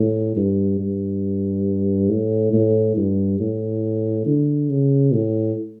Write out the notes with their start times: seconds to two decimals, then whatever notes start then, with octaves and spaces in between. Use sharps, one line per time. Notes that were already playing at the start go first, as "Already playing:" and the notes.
Already playing: A2
0.36 G2
0.79 G2
2.10 A2
2.53 A2
2.96 G2
3.40 A2
4.26 D3
4.69 C#3
5.13 A2